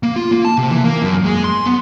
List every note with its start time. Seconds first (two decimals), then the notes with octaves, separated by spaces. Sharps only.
0.03 A#3
0.16 F4
0.31 A#3
0.45 A5
0.58 C3
0.70 E3
0.84 A#3
1.02 F#2
1.24 G#3
1.44 C6
1.66 B3